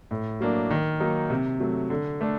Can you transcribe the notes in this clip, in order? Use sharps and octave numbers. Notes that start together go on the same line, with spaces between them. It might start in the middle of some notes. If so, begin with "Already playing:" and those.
A2
F#3 A#3 D4
D#3
F#3 A#3 D#4
C3
F#3 A3
D3
A3 D4